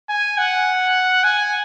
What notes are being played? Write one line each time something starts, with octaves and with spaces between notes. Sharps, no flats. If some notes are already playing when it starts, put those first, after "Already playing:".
G#5
F#5
G#5